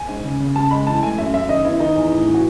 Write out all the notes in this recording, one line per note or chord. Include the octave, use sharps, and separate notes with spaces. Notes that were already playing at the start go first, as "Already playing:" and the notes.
Already playing: G#5
G#2
C#3
C#3
C#3 A5
G#3 B5
E3 A5
A3 G#5
F#2 E5
F#2 E5
D#3 D#5
B3 E4
D#3 D#4
E2
A2
E3
F#4